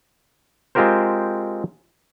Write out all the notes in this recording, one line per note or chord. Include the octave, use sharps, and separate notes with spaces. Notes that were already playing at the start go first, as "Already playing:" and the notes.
G#3 C4 F4 G4 A#4 C5